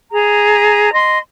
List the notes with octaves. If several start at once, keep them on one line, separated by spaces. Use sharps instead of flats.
G#4 A#5
D#5 C6